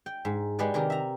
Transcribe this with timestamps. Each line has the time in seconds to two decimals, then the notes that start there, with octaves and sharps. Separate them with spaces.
0.06 G5
0.25 G#2
0.59 G#3 G4 G#4 B4 D5 F#5
0.74 C3 D#3 G4 A#4
0.90 E5 A#5